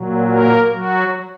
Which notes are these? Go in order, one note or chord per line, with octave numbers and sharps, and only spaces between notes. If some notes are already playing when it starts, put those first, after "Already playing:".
Already playing: A#2 F#3
A#3 A#4
F#3 F#4